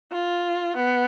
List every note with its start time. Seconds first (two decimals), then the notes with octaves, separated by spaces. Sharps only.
0.12 F4
0.77 B3